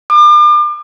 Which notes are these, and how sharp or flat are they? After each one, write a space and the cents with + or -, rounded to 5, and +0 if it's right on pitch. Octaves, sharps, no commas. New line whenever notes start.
D6 +40